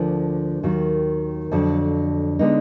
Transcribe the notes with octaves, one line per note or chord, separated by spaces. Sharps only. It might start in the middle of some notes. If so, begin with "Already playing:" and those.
Already playing: D2 D3 F3 A#3
D#2 D#3 F#3
F2 D3 F#3
D3 G#3 B3 D#4